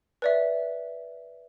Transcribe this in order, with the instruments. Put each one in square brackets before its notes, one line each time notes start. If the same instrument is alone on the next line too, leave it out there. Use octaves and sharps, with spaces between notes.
[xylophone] B4 D5 E5